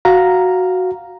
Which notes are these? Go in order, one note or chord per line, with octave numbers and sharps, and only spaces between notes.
F#4 F5 A#5